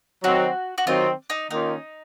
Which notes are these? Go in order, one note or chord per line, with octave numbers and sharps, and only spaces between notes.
D#3 F#3 C4 F#4
F#4
D#3 F#3 C4 F4
D#4
D#3 A#3 C#4 D#4 F4